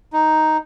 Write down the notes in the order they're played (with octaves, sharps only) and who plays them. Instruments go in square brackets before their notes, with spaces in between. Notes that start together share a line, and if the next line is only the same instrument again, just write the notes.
[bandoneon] D#4